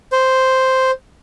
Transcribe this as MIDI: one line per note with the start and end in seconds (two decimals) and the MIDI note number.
0.12 0.91 72